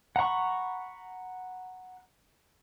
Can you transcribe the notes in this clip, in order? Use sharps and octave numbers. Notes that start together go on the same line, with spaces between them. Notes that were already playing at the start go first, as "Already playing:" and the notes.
F#5 A#5 B5 C#6